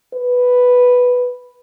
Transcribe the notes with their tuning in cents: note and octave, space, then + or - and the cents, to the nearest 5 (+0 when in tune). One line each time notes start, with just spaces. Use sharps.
B4 +0